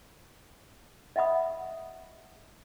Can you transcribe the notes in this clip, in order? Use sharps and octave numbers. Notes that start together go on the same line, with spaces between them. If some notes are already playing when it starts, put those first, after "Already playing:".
D#5 E5 F#5 B5 D#6